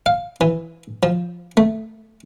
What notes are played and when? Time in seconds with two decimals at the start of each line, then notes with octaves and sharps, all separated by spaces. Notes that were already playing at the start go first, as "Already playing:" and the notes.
0.06 F5
0.41 E3
1.03 F3
1.57 A3